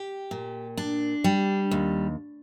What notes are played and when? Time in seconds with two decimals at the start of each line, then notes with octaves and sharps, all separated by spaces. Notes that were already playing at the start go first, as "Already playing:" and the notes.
Already playing: G4
0.31 A#2
0.77 D4
1.24 G3
1.71 D#2